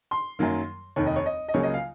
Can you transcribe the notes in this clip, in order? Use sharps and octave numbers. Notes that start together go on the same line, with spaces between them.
C6
F#2 D#3 F#3 A#3
F1 D#2 D#3 C#5
D#5
C#5
D#5
D#5
C#2 C#3 F#3 A#3 C#5
D#5
F5